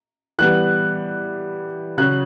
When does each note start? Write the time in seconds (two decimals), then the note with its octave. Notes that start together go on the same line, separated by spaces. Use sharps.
0.38 E3 G3 B3 F#6
1.98 C#3 F#3 C#4 F#6